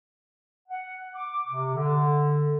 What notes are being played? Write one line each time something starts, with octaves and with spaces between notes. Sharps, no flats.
F#5
D6
C3
D3